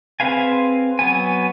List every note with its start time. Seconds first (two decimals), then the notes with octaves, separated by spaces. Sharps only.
0.20 C4 G#4 B4 F5 G#5
0.99 F#3 B3 G#5